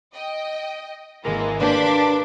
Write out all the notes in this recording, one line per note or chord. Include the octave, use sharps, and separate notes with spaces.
D#5 G5
G#1 E3 G#3 A#3 A#4
A#2 A#3 D4 G4 B4 C6 D6 B6